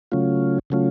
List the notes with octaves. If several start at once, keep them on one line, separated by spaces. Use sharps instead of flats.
C#3 F#3 A3 C#4 F4
C#3 F#3 A3 C#4 F4